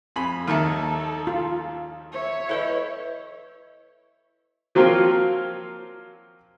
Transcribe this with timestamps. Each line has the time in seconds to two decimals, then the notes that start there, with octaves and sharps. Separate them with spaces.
0.16 F2 G#5 B5
0.47 D#2 D#3 A#3 A4 E5
1.27 F4
2.12 C#5 E5
2.49 E4 A4 B4 D#5
4.75 F3 F#3 A#3 C4 F4